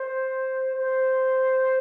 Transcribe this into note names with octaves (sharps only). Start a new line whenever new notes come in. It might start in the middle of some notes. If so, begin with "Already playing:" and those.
Already playing: C5
C5